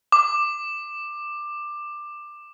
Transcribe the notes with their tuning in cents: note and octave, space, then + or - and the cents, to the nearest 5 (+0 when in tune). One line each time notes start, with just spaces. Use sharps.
D6 +15